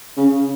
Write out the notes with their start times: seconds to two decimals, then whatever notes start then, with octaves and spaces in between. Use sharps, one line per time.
0.17 C#3